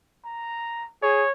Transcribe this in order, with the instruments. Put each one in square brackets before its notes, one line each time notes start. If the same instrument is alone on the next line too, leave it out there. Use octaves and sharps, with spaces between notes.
[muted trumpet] A#5
[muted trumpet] G#4 [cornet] C#5